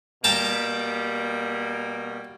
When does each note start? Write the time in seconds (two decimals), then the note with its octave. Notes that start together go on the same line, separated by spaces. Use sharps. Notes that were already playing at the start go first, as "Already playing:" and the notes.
0.24 B2 G3 A#3 G5 A5 A#5